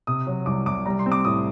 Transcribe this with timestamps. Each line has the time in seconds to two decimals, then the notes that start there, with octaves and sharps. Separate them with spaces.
0.07 C3 D#6
0.27 F#3
0.46 C2 D6
0.66 C2 D6
0.86 G3 A#5
0.99 C6
1.06 C4
1.12 D6
1.25 A2 D#6